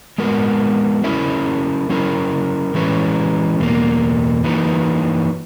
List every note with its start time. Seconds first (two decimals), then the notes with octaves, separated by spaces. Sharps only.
0.18 G#3 B3 F#4 A#4
1.04 F#3 C#4 E4 A#4 E5
1.89 F#3 C#4 E4 A#4
2.74 E3 G#3 C#4 E4 B4
3.60 E2 B2 A#3
4.44 E3 A#3 D#4 F#4 B4